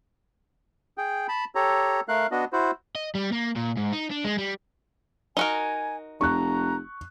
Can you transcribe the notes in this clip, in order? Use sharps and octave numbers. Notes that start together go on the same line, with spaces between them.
G#4 G5
A5 B5
G4 A4 C#5 A#5
A3 A#4 F5 F#6
B3 D4 F#4 D#5
E4 F#4 C5
D#5
G3
A#3
A#2
G#2
D#4
D4
G#3
G3
D#4 F#4 A#4 G#5
F1 A#5 C#6 F#6